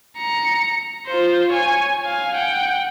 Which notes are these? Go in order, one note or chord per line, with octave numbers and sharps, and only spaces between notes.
A#5 C#7
F4 C5
C#5 G#5
F5 G#5
F#5 G5